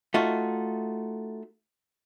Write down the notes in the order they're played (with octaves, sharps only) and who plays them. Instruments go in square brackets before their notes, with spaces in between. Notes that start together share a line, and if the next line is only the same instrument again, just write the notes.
[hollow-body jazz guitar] A3 D#4 F4 F#4